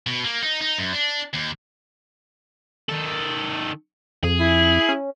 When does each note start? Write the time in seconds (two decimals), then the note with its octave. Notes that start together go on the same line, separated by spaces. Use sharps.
0.07 B2
0.24 A#3
0.43 D#4
0.61 D#4
0.78 F#2
0.93 D4
1.34 D#2
2.89 D#3 A4
4.23 F2 G#4
4.40 E4
4.89 C#4